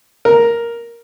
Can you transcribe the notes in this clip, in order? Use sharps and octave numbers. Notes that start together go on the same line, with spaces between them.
A#4